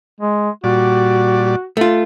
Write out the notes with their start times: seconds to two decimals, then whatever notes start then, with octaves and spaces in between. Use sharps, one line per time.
0.20 G#3
0.64 A#2 G3 F#4 D5
1.77 A3 F4